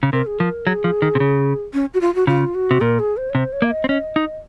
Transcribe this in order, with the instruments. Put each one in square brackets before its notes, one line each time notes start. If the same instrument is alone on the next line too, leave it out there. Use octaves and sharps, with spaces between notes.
[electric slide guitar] C#3
[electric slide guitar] C3 [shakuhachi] A#4
[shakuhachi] G#4
[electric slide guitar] F3 [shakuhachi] A#4
[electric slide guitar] F#3 [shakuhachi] G#4
[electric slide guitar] F3
D#3
C3
C#3
[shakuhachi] C#4
F#4
F4
F#4
[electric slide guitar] C#3 [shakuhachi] F4
[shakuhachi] F#4
[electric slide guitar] C3
[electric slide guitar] A#2 [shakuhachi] A#4
[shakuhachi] G#4
C5
C#5
[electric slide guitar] C3 [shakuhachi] C5
[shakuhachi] C#5
[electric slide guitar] A#3 [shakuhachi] F5
[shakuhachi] D#5
[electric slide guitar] C4
[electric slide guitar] C#4 [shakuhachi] D#5
[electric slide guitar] D#4